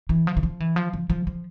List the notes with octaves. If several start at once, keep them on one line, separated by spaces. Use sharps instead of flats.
E3
F3
E3
F3
E3
F3
F3
F3
F3